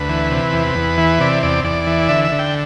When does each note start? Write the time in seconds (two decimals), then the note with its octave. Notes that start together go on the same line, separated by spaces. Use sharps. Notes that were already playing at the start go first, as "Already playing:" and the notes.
Already playing: D2 B4
0.09 E3
0.31 C3
0.53 E2
0.75 E2
0.98 E3
1.20 C3 D5
1.43 E2 D5
1.64 E2 D5
1.87 E3
2.09 D3 E5
2.24 E5
2.32 D3
2.39 G5